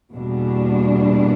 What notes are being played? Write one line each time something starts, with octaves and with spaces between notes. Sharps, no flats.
E2 B2 G3 A#3 D4